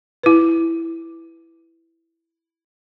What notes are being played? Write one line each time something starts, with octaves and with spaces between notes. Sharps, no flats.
E4 B4